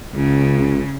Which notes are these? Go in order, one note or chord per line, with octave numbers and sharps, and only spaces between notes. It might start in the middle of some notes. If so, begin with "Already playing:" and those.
C#2 C#3